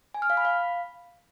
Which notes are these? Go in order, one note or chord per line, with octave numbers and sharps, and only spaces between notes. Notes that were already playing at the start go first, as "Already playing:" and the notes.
G#5
F6
F5
B5
F5